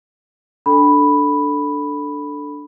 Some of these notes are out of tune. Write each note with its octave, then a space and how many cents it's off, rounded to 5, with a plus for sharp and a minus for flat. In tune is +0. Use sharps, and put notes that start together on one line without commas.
D4 +0 A4 +0 B5 +0